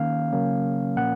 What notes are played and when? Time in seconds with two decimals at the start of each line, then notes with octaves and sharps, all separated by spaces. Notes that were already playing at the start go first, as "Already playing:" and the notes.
Already playing: D#3 A#3 C#4 F5
0.32 C#3 F#3 A#3 C#4
0.96 A#2 F3 A#3 C#4 F#5